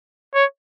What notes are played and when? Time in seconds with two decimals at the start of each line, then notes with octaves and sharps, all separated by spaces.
0.35 C#5